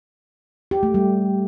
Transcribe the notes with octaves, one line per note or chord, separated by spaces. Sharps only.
G4
A3
G3